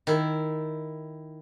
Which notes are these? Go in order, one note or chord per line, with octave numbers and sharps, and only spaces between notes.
D#3 E4